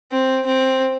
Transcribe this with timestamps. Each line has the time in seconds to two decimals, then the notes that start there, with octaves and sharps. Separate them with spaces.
0.12 C4
0.46 C4